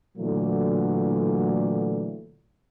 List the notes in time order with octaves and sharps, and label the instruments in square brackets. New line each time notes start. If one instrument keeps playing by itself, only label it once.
[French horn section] A#2 D3 E3 F#3 A3